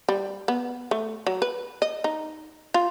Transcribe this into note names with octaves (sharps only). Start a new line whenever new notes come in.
G3
B3
A3
F#3
B4
D#5
D#4
F4